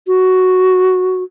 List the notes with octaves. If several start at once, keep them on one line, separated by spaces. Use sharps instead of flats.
F#4